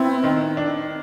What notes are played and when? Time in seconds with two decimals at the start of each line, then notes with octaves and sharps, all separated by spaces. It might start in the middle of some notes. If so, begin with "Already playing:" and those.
Already playing: B3 C4 E4
0.23 D#3
0.57 D4